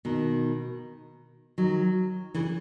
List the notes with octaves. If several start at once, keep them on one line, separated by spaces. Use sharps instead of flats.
B2 D#3
D#3 F#3
C#3 E3